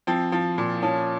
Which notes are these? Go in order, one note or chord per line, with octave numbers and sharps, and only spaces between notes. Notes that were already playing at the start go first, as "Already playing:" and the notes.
F3 C4
F3
A#2
F3 C#4